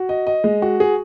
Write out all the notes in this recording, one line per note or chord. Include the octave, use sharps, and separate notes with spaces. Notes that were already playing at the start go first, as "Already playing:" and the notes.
Already playing: F#4
D#5
D#5
G#3
F#4
G#4